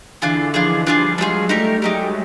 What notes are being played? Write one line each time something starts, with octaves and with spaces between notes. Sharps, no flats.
D3 E3 D4 F4 G#4
D#3 F3 D4 F4 G#4
F3 G3 D4 F4 G#4
F#3 G#3 D4 F4 G#4
G3 A3 D#4 G4 A#4
F#3 G#3 D#4 G4 A#4